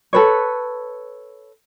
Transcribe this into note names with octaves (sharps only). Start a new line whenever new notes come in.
A4 B4 C#5